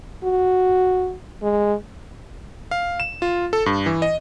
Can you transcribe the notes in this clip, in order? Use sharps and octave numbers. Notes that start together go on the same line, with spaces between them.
F#4
G#3
F5
E7
F4
A4
G2
E3
D#5